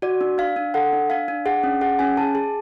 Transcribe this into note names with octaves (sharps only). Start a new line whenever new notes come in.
F#4 D5
D4
D4 F5
D4
A4 F#5
D4
D4 F5
D4
G#4 F#5
C#4
G#4 F#5
C#4 G#5
G#4 A5
G#4